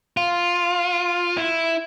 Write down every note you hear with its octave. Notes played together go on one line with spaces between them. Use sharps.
F4
E4